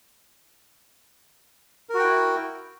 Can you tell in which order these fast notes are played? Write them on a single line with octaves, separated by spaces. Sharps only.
A#4 F#4 G5 E4